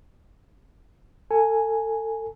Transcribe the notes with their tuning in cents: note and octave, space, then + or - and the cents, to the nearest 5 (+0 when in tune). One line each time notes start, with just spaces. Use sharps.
A4 +25 G#5 +0